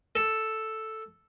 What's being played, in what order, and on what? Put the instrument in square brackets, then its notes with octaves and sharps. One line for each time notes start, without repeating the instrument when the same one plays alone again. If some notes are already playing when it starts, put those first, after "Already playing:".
[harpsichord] A4